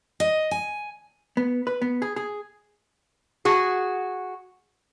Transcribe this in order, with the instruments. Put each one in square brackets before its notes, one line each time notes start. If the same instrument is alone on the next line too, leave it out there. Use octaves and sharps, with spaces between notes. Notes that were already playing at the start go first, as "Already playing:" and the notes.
[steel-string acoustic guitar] D#5
G#5
[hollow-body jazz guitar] B3
B4
B3
G#4
G#4
[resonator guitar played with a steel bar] F#4 G#4